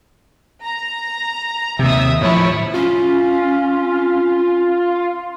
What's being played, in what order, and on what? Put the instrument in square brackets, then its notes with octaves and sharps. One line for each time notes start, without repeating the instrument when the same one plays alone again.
[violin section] A#5
[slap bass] D#2 C3 [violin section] E5 D#6
[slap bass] A2 F3 [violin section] E4 C#5
[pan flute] C#4 [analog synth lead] F4